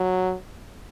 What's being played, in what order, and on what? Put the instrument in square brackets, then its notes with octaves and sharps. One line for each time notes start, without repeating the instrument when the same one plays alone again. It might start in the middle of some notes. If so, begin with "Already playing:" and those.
Already playing: [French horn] F#3